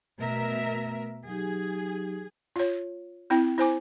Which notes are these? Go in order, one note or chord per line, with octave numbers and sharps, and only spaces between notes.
B2 A3 A#4 E5
F#3 D#4 G4 G#4
F4 C#5
C4 E4 G5
E4 C5 G#5 D6